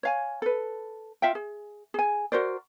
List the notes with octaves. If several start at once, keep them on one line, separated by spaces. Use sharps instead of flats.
C#5 F5 G#5
A4 B4
F4 E5 F5 G5
G#4
G#4 G#5
F#4 A#4 C5 D5